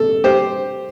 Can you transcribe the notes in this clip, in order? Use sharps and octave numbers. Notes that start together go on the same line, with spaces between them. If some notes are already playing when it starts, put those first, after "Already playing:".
Already playing: A4
G4 C5